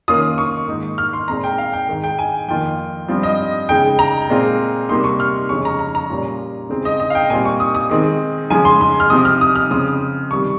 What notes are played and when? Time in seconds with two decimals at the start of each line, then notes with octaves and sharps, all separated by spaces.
0.08 D#3 A#3 C#4 F4 D#6
0.38 C#6
0.68 G#2 D#3 A#3 D#4
0.98 F6
1.13 C6
1.28 A#2 G#3 C4 A#5
1.44 G5
1.58 F5
1.73 G5
1.88 G#2 D#3 G#3
2.04 G5
2.19 G#5
2.48 F2 D#3 A#3 F4 G5
3.08 G2 F3 C4 F4
3.23 D#5
3.69 C#3 G#3 D#4 G5
3.99 A#5
4.30 A#2 G#3 C4 F4
4.89 C3 G3 A#3 D#4 C6
5.04 C#6
5.20 F6
5.49 F2 C#3 G#3 C#4 C#6
5.65 A#5
5.79 A#5
5.95 A#5
6.10 A#2 G3 C#4 F4
6.69 C#3 G#3 C4 D#4
6.85 D#5
7.00 D#5
7.10 F5
7.15 G5
7.30 A#2 G3 C4 F4 G#5
7.45 C#6
7.60 D#6
7.75 D#6
7.90 D#3 G#3 C4 D#4
8.50 C#3 F3 G#3 G#5
8.65 C6
8.81 C6
9.00 F6
9.10 C3 F3 C4 D#6
9.25 F6
9.41 D#6
9.56 F6
9.71 C#3 F3 C4 D#6
10.31 C3 D#3 G3 C#6